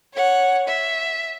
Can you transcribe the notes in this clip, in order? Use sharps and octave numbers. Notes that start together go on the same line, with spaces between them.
C#5 F#5
E5